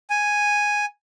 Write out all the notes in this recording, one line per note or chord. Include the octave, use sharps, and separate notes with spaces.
G#5